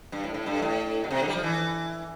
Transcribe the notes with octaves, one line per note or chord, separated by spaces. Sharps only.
G2
A2
A2
G2
A2
B2
C3
D3
G3
F3
E3